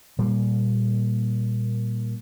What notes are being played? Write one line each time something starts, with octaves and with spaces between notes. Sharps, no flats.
A#2 G3 A#3